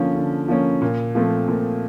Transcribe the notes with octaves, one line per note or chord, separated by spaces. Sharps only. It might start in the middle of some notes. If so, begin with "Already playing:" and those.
Already playing: D3 F3 A#3 C#4
D3
F3 A#3 C#4
A#2
F3 A3 C4
A#2